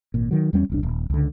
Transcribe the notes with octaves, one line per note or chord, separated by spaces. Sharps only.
G#1 A#2
D#3 F#3
E2 G3 A3 C#4
E1 C2 D4
D#1
C#2 D3